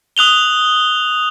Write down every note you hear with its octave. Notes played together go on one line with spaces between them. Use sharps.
D#6 F#6 F7 G7